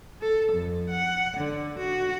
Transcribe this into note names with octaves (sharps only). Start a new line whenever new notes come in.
A4
F2
F#5
D3
F#4